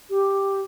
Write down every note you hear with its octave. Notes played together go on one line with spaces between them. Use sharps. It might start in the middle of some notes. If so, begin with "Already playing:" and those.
G4